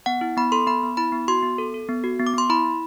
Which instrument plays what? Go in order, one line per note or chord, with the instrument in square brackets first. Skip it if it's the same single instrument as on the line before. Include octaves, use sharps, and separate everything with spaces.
[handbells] B3 F#5
E4
B3 B5
A4 C6
B3 B5
B3
E4 B5
B3
F#4 C6
B3
A4
A4
B3
F#4
B3
D6
B3 C6
E4 B5
E4